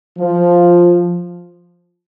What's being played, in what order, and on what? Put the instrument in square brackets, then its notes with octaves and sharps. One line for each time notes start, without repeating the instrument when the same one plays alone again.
[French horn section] F3